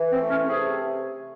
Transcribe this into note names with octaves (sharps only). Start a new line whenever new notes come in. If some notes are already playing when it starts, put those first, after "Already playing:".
Already playing: E3
C4
A3
C#4
C3 G#4